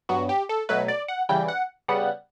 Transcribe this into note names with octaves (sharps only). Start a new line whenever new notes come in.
G2 F#3 B3 F#4
G4
A4
B2 F#3 A3 B4
D5
F#5
C#3 E3 G3 G5
F#5
C#3 G3 B3 F#5